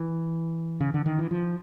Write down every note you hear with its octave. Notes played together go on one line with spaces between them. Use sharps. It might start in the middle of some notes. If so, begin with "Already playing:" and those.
Already playing: E3
C#3
D3
D#3
E3
F3